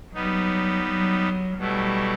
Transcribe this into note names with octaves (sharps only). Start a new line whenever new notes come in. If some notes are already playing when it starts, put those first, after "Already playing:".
F#3 G3 B3 D#4
F#3
B2 F#3 G3 A3 E4